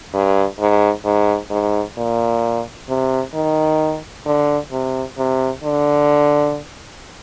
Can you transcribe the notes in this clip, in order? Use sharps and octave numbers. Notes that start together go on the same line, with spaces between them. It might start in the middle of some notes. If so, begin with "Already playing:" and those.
G2
G#2
G#2
G#2
A#2
C3
D#3
D3
C3
C3
D3